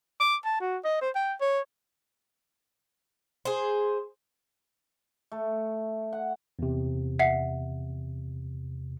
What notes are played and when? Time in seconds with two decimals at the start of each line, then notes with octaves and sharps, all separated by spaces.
0.20 D6
0.45 A5
0.61 F#4
0.84 D#5
1.01 C5
1.15 G5
1.41 C#5
3.45 G#4 C5
5.32 A3
6.13 F#5
6.59 E2 C3
7.19 E5 F#5 C7